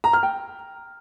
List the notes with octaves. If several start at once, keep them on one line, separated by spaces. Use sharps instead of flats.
A#5
F6
G5